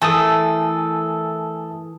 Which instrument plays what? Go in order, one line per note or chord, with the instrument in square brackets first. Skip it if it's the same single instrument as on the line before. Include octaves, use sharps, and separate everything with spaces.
[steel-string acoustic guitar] E3 A#4 [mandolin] A3 A4 [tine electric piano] G#5 A5 D#6